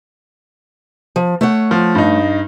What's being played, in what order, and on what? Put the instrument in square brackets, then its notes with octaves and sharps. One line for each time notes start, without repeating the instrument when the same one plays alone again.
[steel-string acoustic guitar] F3
A3 C#5 F#5
[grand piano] F3
G2 D#4